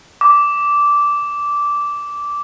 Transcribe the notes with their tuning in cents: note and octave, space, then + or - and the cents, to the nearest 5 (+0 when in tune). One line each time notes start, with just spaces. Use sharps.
D6 -10